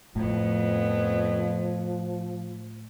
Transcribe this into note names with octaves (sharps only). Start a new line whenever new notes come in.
F2 A2 F3 B3